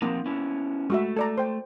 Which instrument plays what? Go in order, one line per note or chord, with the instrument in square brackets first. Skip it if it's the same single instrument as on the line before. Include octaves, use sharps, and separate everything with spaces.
[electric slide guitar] F3 C4 D#4 [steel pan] A#3
[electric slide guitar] B3 C#4 E4
[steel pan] G#3 F#4 E5 [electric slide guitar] A3
[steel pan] A4 D5 A#5
C5 G5